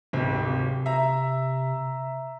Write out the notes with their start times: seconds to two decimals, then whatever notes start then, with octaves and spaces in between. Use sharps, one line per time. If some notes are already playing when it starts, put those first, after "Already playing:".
0.13 D1 G#1 C3 C4
0.86 E5 A#5